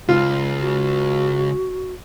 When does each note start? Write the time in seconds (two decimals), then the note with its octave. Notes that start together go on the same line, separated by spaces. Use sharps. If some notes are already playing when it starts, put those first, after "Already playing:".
0.09 C#2 F4
0.60 F#4